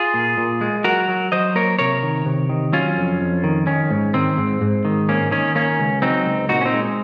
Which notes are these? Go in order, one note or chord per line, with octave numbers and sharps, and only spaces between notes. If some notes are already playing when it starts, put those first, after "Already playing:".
Already playing: F4 G#4
A#2
A#2
G#3
F#3 F#4 A#4
F#3
F#3 C5 D#5
A#3 A#4 C#5
C3 A#4 C#5
D#3
C3
D#3
F#3 C#4 F4
F2
F2
D#3
D#3 C#4
G#2
D#3 C4
G#2
G#2
D#3
A#3 C#4
D#3 C#4
A#3 C#4
C#2
F#3 C4 D#4
C#2
A#2 D#4 F#4
C#4
C4 D#4
G#3